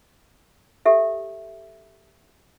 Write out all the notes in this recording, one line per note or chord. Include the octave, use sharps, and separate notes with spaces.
G4 A4 E5